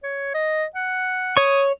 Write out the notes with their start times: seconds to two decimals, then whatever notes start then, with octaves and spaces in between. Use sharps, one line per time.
0.04 C#5
0.34 D#5
0.75 F#5
1.37 C#5 C#6 D#6